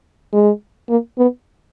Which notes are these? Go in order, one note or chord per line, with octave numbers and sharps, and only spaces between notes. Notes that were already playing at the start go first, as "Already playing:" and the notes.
G#3
A#3
B3